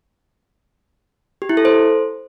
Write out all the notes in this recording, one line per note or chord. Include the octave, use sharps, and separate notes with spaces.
G4
E4
A4
C5